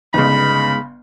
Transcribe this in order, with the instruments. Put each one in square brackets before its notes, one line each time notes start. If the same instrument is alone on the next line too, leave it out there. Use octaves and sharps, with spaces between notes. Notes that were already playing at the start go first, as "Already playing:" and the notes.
[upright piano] G1 C#3 [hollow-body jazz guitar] G#3 B3 D#4 [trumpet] B5